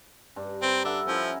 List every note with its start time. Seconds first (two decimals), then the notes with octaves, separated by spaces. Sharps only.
0.36 G2 D4
0.62 C4 A#5 B5
0.85 D4 A4 E5 F#5
1.07 F3 C#4 E4 A#4